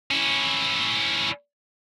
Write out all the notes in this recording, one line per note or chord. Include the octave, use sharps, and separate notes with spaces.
C#4 E4